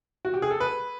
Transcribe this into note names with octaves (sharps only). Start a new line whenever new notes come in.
F#4
G4
G#4
A4
B4